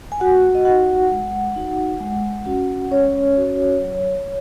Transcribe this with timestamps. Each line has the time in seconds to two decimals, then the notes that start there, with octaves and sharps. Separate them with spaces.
0.12 G#5
0.20 G#3 F#4 F#5
0.55 D#5
0.65 D#4 F#4 F#5
1.11 G#3
1.56 D#4 F#4
2.00 G#3
2.46 C#4 F#4
2.91 G#3 C#4 C#5
3.37 C#4 F#4
3.81 F#3